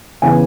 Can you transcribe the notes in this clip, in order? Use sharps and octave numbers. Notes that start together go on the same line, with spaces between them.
C#3 E3 B3 G#5